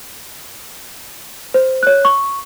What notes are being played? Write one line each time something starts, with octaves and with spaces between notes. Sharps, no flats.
C5
C#5 F#6
C#6